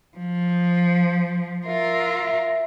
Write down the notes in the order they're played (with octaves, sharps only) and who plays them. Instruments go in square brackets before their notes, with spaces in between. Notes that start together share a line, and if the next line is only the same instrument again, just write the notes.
[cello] F3
[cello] F4 A#4 [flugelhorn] E5